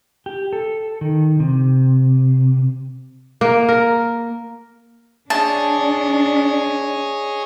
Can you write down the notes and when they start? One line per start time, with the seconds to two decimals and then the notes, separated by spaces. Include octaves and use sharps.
0.26 G4
0.53 A4
1.01 D#3
1.40 C3
3.41 A#3
3.69 A#4
5.30 D4 G#4 C#5 D#5 A5